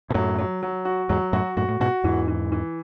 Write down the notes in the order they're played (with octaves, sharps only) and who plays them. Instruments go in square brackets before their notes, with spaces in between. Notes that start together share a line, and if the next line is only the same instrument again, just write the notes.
[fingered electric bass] B2
[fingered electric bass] F#2 A2 [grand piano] F#3
[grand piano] F#3
F#3
F#4
[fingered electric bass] E2 G#2 [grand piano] F#3
[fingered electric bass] F#2 A2 [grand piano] F#4
[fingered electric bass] F#2 A2 [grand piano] F#4
[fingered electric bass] A2
[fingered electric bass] G#2 B2 [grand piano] F#4
[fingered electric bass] E2 G#2 [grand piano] E3
[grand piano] E3
E3